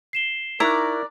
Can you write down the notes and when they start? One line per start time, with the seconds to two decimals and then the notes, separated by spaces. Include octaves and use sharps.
0.13 C7 E7 G7
0.60 D#4 E4 A#4 D5 A#5 C#6 F#6